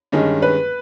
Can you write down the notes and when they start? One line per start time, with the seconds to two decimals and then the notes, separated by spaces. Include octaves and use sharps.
0.12 G2 D#3 G#3 C#4
0.42 B4